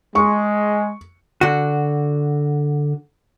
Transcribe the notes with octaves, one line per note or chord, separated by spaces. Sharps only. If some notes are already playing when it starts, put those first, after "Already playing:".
G#3 C#6
D3 F#4